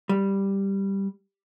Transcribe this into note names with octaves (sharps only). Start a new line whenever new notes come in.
G3